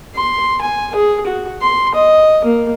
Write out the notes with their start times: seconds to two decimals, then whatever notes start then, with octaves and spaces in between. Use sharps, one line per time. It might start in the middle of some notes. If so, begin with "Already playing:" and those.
0.15 C6
0.61 G#5
0.95 G#4
1.26 F#4
1.61 C6
1.94 D#5
2.44 A#3